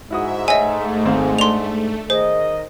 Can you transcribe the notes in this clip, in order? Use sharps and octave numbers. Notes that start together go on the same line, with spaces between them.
G#2 E4 F#4 E5 D#6
A3 D#4 C#5 D#5 E5 G#5
G#1 C4 F5
D4 C6 F7
D#3 G#4 C5 D#5